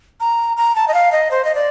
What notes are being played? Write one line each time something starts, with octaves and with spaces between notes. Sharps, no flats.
A#5
A#5
A5
D#5
F5
D#5
C5
D#5
D5